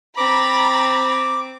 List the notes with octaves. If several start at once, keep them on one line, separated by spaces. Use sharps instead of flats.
C4 A#5 B5 D6 A6